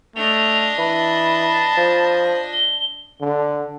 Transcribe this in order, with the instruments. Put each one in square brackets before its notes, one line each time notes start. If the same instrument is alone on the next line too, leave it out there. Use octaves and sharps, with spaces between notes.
[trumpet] A3 [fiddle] D4 D#5 [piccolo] F7
[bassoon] E3 [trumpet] A5 [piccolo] B5
[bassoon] F3
[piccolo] G7
[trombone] D3